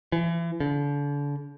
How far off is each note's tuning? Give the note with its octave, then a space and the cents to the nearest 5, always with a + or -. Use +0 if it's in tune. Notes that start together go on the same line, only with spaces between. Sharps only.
E3 +35
D3 -35